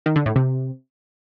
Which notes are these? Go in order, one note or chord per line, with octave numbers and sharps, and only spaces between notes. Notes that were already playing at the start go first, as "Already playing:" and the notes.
D#3
D3
A2
C3